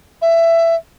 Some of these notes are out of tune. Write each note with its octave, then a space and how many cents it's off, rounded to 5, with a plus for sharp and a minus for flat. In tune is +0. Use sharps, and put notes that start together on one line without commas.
E5 +15